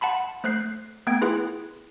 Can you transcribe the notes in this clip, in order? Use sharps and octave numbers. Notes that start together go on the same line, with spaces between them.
F#5 A5 B5 C6
A3 C5 F#6 C7
A3 B3 G5 G#6 D7
E4 F4 G#4 B4